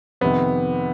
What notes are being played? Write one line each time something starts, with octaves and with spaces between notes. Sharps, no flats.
F2 C3 D#3 B3